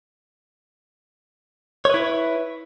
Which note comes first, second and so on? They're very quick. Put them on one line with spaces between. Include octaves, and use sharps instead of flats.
C#5 B4 E4